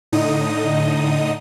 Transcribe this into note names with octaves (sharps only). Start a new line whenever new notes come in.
A2 D3 D#4 D#5 D#6